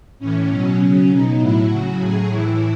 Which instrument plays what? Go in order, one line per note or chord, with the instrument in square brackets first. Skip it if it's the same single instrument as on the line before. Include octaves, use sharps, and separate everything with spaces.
[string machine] A2 E3 C#4
B2 F#3 C#4
C#3 F#3
B2 F#3 D#4
A2 F#3 E4
C#3 F#3 F#4
A2 F#3 G#4
A2 E3 E4